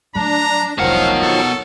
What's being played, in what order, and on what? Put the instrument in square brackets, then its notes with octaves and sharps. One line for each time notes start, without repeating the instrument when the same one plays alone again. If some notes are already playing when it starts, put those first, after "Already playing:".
[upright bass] F#3 A3 [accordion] D4 [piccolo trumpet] A#5
[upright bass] F1 C2 [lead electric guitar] B2 F#5 [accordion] D#3 F3 F#3 [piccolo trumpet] F5
[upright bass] D#4 [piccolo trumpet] A4